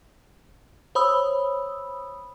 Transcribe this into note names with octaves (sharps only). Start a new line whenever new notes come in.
C5 C#5 B5 D#6 E6